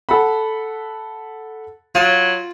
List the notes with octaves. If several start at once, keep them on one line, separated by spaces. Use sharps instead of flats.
A4 F#5 B5
F#3 F4